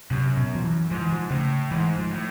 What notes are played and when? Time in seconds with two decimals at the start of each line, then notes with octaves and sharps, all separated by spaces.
0.11 F#2 C3
0.37 B2
0.55 F3
0.64 E3
0.91 G#2 F3
1.02 E3
1.13 F3
1.30 A2 C#3
1.71 G#2 E3
1.98 F3
2.11 A2